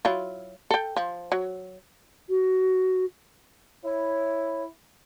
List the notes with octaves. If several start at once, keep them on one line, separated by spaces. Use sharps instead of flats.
F#3 E4 F4
A4 G5
F3
F#3
F#4
E4 C#5